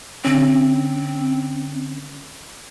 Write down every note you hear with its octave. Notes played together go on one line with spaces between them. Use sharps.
D3 C4 C#4